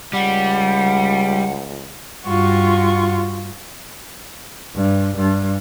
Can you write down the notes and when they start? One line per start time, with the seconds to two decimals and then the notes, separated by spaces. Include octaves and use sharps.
0.13 C#2 G3 F#5
2.26 G2 F4 F#4 C#6
4.76 G2
5.16 G2